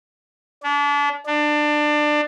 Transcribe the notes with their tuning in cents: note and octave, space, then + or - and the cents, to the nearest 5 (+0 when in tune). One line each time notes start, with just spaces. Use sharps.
D4 -35
D4 +20